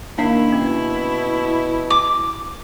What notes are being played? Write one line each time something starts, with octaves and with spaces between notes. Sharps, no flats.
D#3 A#3 D4 E4 F5
B2 C#4
D6